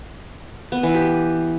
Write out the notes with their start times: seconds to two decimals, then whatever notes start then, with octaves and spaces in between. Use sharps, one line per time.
0.72 B3
0.83 E3
0.95 G4